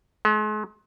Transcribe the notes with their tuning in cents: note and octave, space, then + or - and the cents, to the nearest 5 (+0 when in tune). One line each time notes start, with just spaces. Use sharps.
G#3 +40